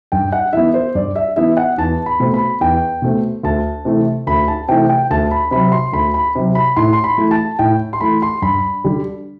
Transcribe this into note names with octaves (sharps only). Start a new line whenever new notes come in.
G2 G5
F#5
E3 B3 E5
C5
G2 D5
E5
E3 B3 E5
F#5
E2 A5
B5
B2 A3 C4
B5
E2 G5
B2 A3 C4
D2 A5
C3 E3 A3
D2 B5
A5
C3 E3 A3 G5
G5
D2 A5
B5
C3 F#3 B5
C6
D2 B5
B5
C3 F#3
B5
A2 C6
C6
B5
E3 A3
A5
A2 G5
C6
E3 A3 B5
C6
G2 B5
D3 G3